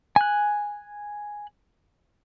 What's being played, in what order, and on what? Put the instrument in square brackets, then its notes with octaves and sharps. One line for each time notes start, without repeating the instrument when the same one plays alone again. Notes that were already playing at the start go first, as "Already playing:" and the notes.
[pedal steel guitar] G#5 F#6